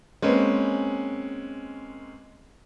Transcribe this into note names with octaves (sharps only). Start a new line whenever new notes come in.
G#3 A#3 C4 C#4 B4